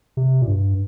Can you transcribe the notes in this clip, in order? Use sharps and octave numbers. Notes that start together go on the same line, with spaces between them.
C3
A#2
G2